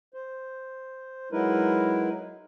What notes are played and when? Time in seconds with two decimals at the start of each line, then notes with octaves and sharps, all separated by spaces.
0.14 C5
1.32 F#3 G#3 D#4 E4 A#4 B4